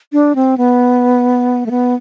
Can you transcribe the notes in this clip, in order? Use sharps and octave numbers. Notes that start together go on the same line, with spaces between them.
D4
C4
B3
A3
B3